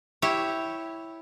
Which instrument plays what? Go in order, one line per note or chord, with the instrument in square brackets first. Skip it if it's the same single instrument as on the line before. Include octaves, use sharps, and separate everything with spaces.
[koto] E4 G4 C#5